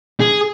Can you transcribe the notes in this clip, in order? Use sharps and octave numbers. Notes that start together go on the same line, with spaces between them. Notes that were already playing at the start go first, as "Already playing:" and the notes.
G#4